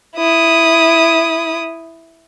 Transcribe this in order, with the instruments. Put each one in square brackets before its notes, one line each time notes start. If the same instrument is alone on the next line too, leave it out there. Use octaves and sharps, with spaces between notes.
[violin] E4 D#6